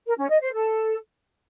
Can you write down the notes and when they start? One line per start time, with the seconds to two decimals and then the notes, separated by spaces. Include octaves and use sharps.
0.06 A#4
0.18 C#4
0.30 D#5
0.41 C5
0.53 A4